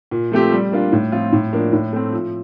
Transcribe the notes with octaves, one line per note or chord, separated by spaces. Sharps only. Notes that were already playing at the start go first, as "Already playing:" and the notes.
A#2
F3 A3 C4 G4
G3
A#3 D4 F4
A2
F3 C4 F4
A2
F3 A#3 D4
A2
A3 C4
F3